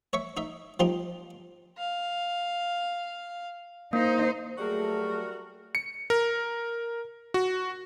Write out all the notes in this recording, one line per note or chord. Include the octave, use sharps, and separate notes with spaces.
C#5 E5 C#6
D#4 E5
F3 G3 D#4 F4 G4
F5
A#3 D#4 C5
F#3 G3 A3 F#4 G#4 A#4
C#7
A#4
F#4